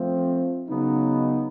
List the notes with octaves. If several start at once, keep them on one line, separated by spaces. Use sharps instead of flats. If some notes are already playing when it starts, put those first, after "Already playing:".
Already playing: F3 A3 C4
C#3 F#3 B3 D#4